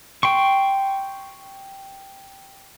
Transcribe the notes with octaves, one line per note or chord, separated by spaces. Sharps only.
G5 C6 C#6